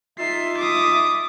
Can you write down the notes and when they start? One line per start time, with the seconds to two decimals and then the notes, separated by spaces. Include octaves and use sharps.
0.19 D#4 F4 E5 C7
0.58 D6 D#6